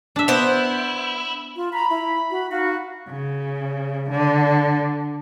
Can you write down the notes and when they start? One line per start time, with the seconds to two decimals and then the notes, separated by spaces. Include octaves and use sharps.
0.16 D4 E5
0.28 B3 E4 C5
1.56 F4
1.73 A#5 B5
1.90 E4
2.31 F#4
2.51 D#4 F#4 F5
3.09 C#3
4.10 D3